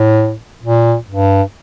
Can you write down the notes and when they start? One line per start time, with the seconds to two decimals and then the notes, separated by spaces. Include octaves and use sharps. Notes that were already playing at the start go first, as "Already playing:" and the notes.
Already playing: A2
0.63 A#2
1.10 G2